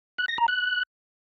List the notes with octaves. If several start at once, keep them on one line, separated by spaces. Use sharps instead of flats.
F#6
A#6
A#5
F#6